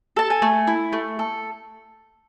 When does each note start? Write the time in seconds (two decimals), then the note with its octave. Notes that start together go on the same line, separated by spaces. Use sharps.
0.16 A4 A5
0.30 G#5
0.42 A3
0.67 E4
0.93 A3
1.19 A4